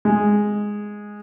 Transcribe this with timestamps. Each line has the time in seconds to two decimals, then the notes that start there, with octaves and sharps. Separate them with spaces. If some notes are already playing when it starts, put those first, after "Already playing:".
0.05 G#3